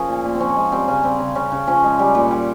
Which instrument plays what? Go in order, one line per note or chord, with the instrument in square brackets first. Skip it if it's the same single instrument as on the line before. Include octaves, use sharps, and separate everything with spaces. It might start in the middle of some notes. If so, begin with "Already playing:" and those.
Already playing: [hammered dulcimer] F3 C#4 G#4 A#4
A#2
A#2
C4
F3 C#4
G#3
G3 C4
C#3 C#4
G3 C4
C#3
C#3 C#4
C#3
F3 C#4
G#3
G3
A#2
G3